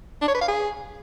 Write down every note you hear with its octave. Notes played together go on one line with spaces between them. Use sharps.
D4
C#5
B4
F5
G#4